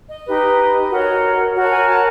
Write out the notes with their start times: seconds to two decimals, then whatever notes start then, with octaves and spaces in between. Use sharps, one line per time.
0.09 D#5
0.26 D#4 G4 B4
0.91 F#4 A#4 C#5
1.55 F#4 A#4 C#5
1.65 A5
1.72 G#5
1.88 A5